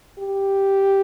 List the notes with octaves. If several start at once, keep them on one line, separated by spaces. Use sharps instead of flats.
G4